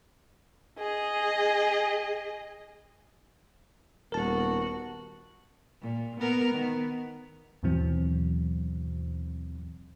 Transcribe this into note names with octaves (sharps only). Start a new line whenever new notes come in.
G#4 D#5
D#1 B3 F#4 A#4 A5
A#2
B3 A#4
D#3 B3
D#2 G#2 B2 E3 F#3 C4